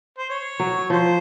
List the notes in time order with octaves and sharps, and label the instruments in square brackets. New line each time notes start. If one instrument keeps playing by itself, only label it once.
[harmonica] C5
C#5
[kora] F#3
[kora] F3 [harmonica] C5